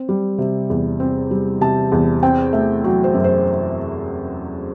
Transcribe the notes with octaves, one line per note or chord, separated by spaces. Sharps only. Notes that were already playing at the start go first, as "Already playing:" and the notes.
Already playing: C4
G3
C3
E2
C4
G3
C3 A5
E2
C4 G5
A3 E5
F#3
C5
F#2
C5